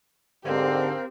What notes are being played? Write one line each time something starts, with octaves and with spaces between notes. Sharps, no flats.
G#2 D3 C4 G4 A#4 C5 F5